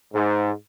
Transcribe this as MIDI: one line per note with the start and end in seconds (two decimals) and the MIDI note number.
0.14 0.51 44